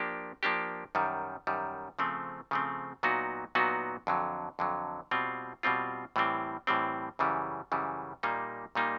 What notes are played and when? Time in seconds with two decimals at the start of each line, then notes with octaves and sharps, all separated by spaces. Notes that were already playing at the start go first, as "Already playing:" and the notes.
Already playing: F3 A#3 D4 G4
0.43 F3 A#3 D4 G4
0.95 F#2 D#3 G3
1.47 F#2 D#3 G3
1.99 C#3 F3 A3 C4
2.51 C#3 F3 A3 C4
3.03 A#2 F#3 B3 D#4 F#4
3.55 A#2 F#3 B3 D#4 F#4
4.07 F2 D3 F#3
4.59 F2 D3 F#3
5.11 B2 G3 C4 F4
5.63 B2 G3 C4 F4
6.16 A2 E3 G3 C4
6.67 A2 E3 G3 C4
7.19 F#2 C#3 E3 G3
7.72 F#2 C#3 E3 G3
8.23 A#2 G3 A#3 D#4
8.75 A#2 G3 A#3 D#4